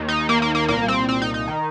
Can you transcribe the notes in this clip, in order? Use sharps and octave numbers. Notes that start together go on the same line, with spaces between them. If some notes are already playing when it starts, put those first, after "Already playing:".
Already playing: D#2 D#3
D#4
A#3
A#3
A#3
C2 A#2 A#3
C4
C4
D#4
D#4
D#3